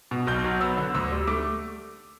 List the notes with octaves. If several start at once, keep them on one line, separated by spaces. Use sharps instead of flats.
B2
B1 G6
F#3
B3 E6
D3
D2 E6
G3
A3 D6